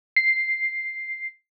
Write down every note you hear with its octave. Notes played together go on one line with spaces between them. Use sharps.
C7